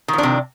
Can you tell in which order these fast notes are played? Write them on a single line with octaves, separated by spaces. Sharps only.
D#3 F3 D4 C3